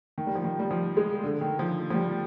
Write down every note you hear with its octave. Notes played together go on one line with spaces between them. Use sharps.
D#3
G3
F3
D#3
G3
F3
G#3
D3
D#3
F3
F3
G3